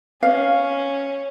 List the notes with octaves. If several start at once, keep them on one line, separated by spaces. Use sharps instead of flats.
C#4 F5